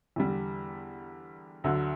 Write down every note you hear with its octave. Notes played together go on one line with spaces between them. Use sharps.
E2 D3 G3
D2 D3 F#3